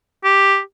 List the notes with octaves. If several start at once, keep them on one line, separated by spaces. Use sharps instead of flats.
G4